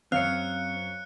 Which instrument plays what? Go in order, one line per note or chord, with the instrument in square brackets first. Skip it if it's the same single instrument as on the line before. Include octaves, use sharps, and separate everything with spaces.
[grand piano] F#2 C#5 [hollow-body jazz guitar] C4 [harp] F5 [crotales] F#6 C#7